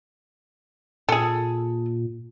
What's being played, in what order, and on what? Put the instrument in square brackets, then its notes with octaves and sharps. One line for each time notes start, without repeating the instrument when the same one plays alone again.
[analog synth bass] A#2 [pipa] G#4 A4